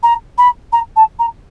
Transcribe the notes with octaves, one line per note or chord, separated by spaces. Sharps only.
A#5
B5
A#5
A5
A#5